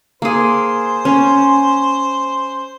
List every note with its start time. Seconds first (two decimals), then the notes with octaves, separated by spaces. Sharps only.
0.22 A#3 G#4 C5
1.05 C#4